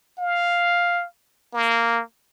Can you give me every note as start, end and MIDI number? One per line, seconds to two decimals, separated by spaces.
0.18 1.05 77
1.54 2.01 58